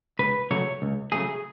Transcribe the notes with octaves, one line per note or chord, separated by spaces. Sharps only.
C#2 B4
C#3 F#3 A3 C#5
C#2
C#3 F#3 A3 G#4